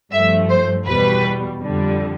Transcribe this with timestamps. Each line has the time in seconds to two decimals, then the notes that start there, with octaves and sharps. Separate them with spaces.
0.12 G2 F3 A3 E5
0.49 C5
0.86 E2 B2 G3 B4
1.60 F2 D3 G3